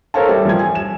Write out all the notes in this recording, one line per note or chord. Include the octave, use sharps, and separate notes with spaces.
A4 A#4 C5 C#5 F5 A5
G3 E5
F3 G#6
G#5
E7